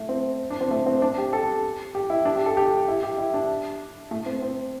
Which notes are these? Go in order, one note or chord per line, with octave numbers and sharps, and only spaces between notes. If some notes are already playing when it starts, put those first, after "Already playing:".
Already playing: A3
C4
D4
C4
A3
C4
D4
G4
A4
G4
E4
D4
G4
A4
G4
E4
G4
E4
D4
A3
C4
C4